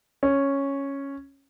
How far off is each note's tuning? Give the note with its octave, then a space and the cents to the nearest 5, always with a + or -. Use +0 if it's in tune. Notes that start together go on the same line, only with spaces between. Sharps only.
C#4 -5